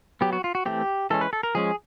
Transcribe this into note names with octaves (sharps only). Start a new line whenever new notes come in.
F#3 B3 G4
F#4
F4
F#4
E3 A3 C4 G4
E3 G#3 C#4 A4
B4
A4
A#4
F3 G#3 C#4 G#4